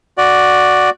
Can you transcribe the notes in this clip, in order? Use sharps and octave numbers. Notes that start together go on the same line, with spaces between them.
F#4 D5